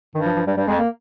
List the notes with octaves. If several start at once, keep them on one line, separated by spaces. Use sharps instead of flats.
G2 D#3
F3
F3
G2 G3
G2 G3
F2 G#3
A#3